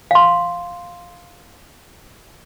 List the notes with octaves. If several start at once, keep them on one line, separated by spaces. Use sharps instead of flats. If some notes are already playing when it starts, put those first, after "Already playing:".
F5 C6